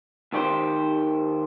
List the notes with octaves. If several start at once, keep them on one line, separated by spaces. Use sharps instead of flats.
D#2 D#3 G4 B4 C5